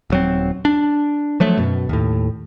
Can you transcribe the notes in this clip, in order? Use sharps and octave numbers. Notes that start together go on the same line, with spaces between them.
D#1 F#3 C4
D4
F3 F#3 A3
F#2 B2
D#2 A2